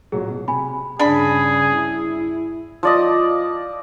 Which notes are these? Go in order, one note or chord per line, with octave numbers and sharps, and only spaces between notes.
A1 A#2 F#3 G#4
B2
C3 G#5 B5
G2 C#3 D4 G#4 B5
E4
F3 D5 D#5